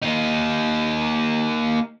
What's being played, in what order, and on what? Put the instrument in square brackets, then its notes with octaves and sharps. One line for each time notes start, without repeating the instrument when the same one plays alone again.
[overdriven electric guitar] A#3 D#4